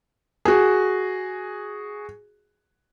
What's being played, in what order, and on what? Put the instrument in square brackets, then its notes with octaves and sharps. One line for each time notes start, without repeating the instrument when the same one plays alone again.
[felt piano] F#4 G#4